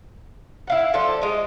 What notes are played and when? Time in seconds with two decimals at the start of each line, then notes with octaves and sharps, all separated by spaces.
0.67 E4 F5 F#5
0.94 F3 D4 A4 C5
1.22 G#3 D#5